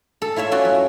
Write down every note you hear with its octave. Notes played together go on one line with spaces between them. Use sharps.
A4
E4 F4 C#5 E5
C#4 F4 F#4 D5
F#2